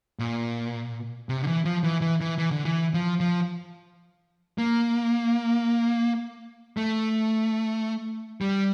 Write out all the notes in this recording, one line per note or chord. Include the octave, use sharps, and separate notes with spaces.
A#2
C3
D3
E3
F3
E3
E3
E3
E3
D3
E3
F3
F3
A#3
A3
G3